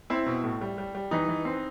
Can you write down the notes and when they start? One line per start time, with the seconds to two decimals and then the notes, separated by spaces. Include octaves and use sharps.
0.10 C4 E4
0.26 B2
0.44 A2
0.61 G3
0.78 G3
0.95 G3
1.11 E3 D#4
1.28 E3
1.45 C4